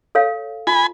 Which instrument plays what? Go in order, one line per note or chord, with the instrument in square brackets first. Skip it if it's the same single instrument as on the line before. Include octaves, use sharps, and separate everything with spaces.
[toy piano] A4 C#5 F5
[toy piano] F4 [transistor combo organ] G#5 B5